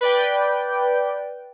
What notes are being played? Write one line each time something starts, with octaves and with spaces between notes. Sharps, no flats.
B4 D5 G5